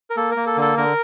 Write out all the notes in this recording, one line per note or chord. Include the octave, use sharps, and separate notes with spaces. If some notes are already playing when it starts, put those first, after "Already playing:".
A#4
A#3 A4
A#4
A#3
A4
D3 A4
D3 A#4